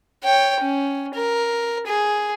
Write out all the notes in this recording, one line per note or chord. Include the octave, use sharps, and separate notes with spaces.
C#5 G5
C#4
A#4
G#4